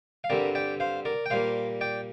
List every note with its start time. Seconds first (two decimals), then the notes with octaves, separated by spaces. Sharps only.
0.24 F5
0.30 G2 D3 G3 C4 A#4 D5
0.55 D5 G5
0.80 C5 F5
1.05 A#4 D5
1.26 G5
1.30 A#2 G3 A#3 C5 F5
1.81 D5 G5